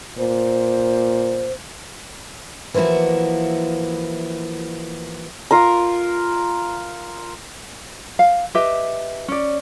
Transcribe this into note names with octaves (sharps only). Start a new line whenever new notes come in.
A#2 C5
E3 F3 A#3 E4 F#4
F4 A#4 A#5
F5
G4 B4 D#5 E5
C#4 D5